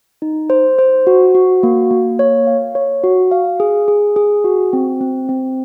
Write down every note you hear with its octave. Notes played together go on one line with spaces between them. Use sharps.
D#4
C5
C5
F#4
F#4
A#3
A#3
C#5
F5
C#5
F#4
F5
G#4
G#4
G#4
F#4
C4
C4
C4